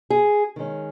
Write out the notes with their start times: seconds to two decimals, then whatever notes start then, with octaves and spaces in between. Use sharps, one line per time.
0.10 G#4
0.56 D#3 G#3 C#4